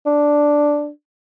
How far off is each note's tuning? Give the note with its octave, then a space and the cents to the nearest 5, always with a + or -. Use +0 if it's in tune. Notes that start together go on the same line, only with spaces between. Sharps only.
D4 +0